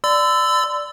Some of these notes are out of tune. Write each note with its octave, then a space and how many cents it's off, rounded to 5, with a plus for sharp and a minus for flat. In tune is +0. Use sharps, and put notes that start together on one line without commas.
D5 +0 C6 -45 E6 +0